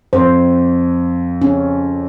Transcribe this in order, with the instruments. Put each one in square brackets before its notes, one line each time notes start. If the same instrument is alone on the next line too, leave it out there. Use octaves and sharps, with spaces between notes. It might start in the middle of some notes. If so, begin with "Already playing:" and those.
[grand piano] F2 [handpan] C5
[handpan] C#4